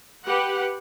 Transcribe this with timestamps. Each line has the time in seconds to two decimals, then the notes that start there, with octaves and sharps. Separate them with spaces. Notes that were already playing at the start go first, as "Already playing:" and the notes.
0.25 G4 B4 F#5